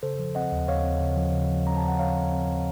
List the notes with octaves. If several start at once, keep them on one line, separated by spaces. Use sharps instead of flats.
C#3 A4 C5
F3
C4 D#5 F#5
D#2
D#2 C#5 F5
C4
C#3
F3
C#3
F3
C4 A#5
A5
C4
F#5
D#2 C#5 F5
C4
C4
F3